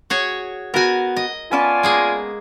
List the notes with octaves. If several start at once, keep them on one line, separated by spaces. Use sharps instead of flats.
F#4 G#4 C#5
B3 F#4 A#4 G#5
D#5
B3 C#4 F4 D5 G#5 A5
G#3 A#3 G#4